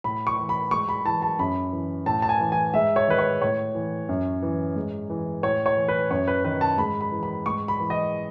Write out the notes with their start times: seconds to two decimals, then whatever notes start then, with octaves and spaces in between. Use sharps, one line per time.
0.04 A2 B5
0.27 C#6
0.38 E3
0.49 B5
0.71 G#2 C#6
0.89 B5
1.05 E3 A5
1.22 A5
1.39 F#2 B5
1.73 E3
2.06 A2 A5
2.22 A5
2.29 G#5
2.40 E3
2.52 G#5
2.74 G#2 E5
2.96 C#5
3.07 D#3 B4
3.18 C#5
3.41 A2 C#5
3.75 E3
4.09 F#2
4.42 E3
4.76 G#2
5.10 E3
5.43 A2 C#5
5.66 C#5
5.77 E3
5.88 B4
6.11 F#2 C#5
6.28 B4
6.45 D#3 B4
6.61 A5
6.78 G#2 B5
7.01 B5
7.12 E3
7.23 B5
7.46 G#2 C#6
7.68 B5
7.80 E3
7.90 D#5